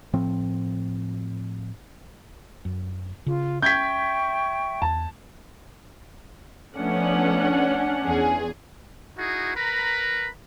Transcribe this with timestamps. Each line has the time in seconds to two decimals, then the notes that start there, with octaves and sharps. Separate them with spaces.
0.13 A2 F3 C4
2.65 F#2
3.26 C#3 F4
3.62 C#4 E5 G5 C#6 G6 G#6 B6
4.82 E2 A5
6.76 F3 A3 B3 C#4 D4 F#5
8.04 E2 G#4
9.17 D#4 E4 F#4 G#4
9.55 A#4 B4 A#5 B5